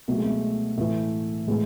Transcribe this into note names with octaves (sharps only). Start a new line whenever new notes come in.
B2 F#3 A3
G#3
A3
A2 E3 A3
A2 E3 G#3